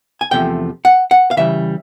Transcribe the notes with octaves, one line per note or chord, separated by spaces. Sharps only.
G#5
E2 C3 F3 A3 G5
F#5
F#5
F5
C#3 E3 G3 E5